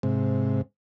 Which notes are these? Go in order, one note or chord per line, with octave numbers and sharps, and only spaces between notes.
G#2 C3